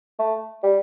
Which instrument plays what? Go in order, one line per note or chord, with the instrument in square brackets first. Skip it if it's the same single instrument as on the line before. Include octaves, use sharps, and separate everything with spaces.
[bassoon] A3
G3